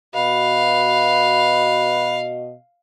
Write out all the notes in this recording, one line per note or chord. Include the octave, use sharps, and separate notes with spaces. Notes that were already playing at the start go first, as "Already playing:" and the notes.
B2 F#4 B4 D#5 F5